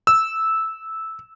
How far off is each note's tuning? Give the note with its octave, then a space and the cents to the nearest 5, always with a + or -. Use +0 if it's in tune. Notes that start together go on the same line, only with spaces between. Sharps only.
E6 -10